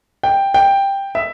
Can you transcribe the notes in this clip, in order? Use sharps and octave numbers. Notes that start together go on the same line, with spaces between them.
G5
G5
E5